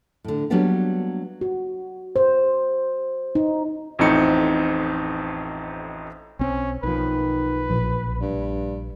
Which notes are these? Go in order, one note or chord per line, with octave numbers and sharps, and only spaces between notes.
A2 D3
F#3 G3 A#3 B3 D4 G4
F#4
C5
D#4
A1 F2 A2 C4 D#4 C#7
B1 C4 C#4
B1 D#3 F3 B4
A#1
G2